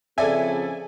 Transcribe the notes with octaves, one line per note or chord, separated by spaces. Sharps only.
C#3 F3 C4 G#4 A4 D5 E5 G#5